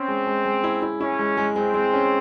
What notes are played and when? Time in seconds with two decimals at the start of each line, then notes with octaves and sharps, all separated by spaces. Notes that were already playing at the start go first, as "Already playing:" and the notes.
Already playing: C4 C#4
0.08 G#3
0.27 G#3
0.45 G#3
0.64 E4
0.82 E4
1.01 C#4 E4
1.19 G#3
1.37 G#3
1.56 G#3 C4
1.74 G#3
1.93 C#4